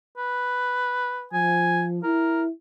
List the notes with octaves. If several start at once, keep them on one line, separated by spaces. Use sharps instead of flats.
B4
F3 G#5
E4 A#4